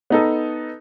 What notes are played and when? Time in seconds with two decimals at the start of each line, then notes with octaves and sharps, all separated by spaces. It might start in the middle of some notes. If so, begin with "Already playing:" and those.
0.10 B3 D#4 A4